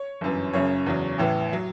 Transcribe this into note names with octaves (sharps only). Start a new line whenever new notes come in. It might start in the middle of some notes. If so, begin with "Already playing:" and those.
Already playing: C#5
G1 F#2 E3
F#1 F#2 C#3 C#5
E2 C#3 F#3
A1 A2 E3
F#3